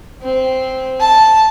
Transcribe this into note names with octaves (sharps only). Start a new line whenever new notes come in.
C4
A5